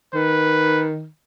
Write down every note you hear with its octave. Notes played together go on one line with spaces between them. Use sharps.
D#3 B4